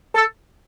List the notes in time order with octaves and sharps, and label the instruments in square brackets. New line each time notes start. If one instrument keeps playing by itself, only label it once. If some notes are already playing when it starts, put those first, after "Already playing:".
[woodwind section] A4